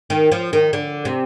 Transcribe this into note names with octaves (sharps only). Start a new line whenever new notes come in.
D#3
F3
D#3
D3
C3